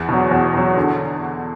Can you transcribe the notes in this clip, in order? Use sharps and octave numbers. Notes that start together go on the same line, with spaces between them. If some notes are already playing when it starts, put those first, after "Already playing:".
Already playing: E2
B2 F#3
E2
B2 F#3
D3